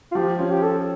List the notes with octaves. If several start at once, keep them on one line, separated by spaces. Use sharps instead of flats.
F4
F3 G4
C#4 F4
G4
C#4 A4